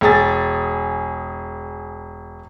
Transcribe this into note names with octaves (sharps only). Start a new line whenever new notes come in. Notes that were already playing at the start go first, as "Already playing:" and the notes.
E1 G#4 A6